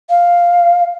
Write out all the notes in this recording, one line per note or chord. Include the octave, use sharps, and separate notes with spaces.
F5